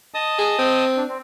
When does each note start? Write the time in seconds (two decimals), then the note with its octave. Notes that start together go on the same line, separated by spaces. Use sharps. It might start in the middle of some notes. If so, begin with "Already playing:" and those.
0.14 D#5 A5 D#6
0.39 G#4
0.59 C4
0.96 D4
1.08 C4